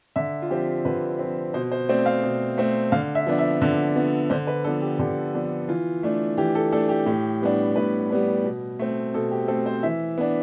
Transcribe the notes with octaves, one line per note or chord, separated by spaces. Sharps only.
D3 E5
F4
F3 C4 G4
D3 B4
F3 C4
B2 C5
C5
A3 C4 D5
F5
B2
A3 C4
D3 F5
E5
F3 B3 D4
E5
D3 D5
F3 B3 D4
D3 C5
B4
F3 B3 D4 A4
G4
D3 G4
F3 B3 D4
E3 F4
A3 D4
E3 G4
A4
A3 D4 A4
G4
A2 G4
G3 B3 D4
A2 B4
G3 B3 D4
B2
A3 C4
B2 A4
G4
A3 C4 A4
C5
E3 E5
B3 D4